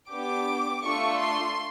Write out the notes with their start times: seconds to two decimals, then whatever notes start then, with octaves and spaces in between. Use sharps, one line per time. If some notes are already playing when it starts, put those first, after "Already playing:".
0.10 B3 D4 G4 D6
0.83 A3 D4 F4 A4 C#6
1.20 C6